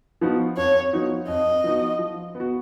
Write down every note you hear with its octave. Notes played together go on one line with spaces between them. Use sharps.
F3 B3 D#4 F#4
F2 C#5
F3 B3 D#4 F#4
F2 D#5
F3 B3 D#4 F#4
F3
B3
F#4